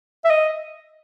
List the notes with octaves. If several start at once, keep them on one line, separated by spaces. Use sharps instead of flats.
E5
D#5